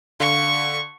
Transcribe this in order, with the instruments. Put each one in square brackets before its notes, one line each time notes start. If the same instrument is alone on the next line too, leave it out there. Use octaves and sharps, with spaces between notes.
[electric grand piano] D3 F5 [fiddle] C#6